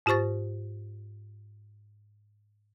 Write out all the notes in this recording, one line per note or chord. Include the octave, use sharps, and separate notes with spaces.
G#2 F4 G4 C5 C#6 A6